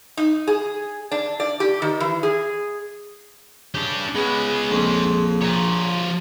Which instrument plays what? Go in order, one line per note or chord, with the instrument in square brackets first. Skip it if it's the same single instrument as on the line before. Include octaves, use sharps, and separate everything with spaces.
[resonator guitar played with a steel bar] D#4
G#4
D4
D5
G4
D#3
E3
G#4
[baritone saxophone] C#3 [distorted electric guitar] D4 G4
[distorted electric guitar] G#3 C#4 [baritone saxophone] B3 [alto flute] G#4
[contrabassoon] A#1 [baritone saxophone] F2
[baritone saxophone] A#2 [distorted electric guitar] F3 C#5